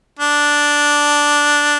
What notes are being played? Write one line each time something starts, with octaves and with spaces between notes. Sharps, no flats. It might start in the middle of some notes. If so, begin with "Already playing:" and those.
D4